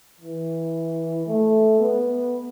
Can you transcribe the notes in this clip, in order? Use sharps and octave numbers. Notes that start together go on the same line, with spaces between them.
E3
A3
B3